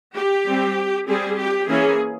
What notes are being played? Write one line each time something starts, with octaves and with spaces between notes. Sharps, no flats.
G4
G3 C4
G3 C4 G#4
G4
E3 A#3 C#4 G#4